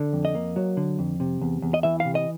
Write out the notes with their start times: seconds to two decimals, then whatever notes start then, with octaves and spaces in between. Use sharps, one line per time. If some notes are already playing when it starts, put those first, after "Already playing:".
Already playing: D3
0.13 F2
0.25 D#5
0.35 A#3
0.56 F#3
0.77 D3
0.99 F2
1.20 C3
1.41 E2
1.62 E2
1.74 D#5
1.83 E3 E5
2.00 F5
2.05 C3
2.15 D#5